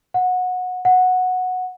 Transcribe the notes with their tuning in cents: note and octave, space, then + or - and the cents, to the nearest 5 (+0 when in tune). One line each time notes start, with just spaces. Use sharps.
F#5 -20
F#5 -10